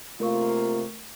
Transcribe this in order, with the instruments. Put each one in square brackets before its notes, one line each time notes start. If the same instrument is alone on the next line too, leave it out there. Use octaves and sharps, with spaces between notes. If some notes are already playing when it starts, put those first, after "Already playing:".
[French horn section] C3 A#3 F4 [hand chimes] A3 A#4 C#6